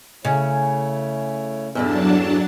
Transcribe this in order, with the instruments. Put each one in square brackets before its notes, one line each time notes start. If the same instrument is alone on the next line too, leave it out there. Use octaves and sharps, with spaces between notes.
[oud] C#3 [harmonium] A3 E4 C#5
[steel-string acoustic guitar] E2 G2 D3 [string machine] F#3 D4 A5